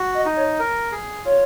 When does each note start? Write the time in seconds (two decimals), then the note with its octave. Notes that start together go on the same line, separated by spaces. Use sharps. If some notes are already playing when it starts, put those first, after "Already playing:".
Already playing: F#4
0.14 D#5
0.25 D#4
0.37 C#5
0.59 A#4
0.92 G#4
1.25 F4 C#5